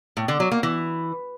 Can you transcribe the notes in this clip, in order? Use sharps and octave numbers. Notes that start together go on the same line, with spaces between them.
A2
D3
F#3
A#3
E3